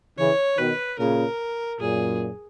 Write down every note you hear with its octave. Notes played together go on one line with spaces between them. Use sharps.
C#3 E3 C#5
B2 D#3 B4
A#2 C#3 A#4
F#2 A#2 G#4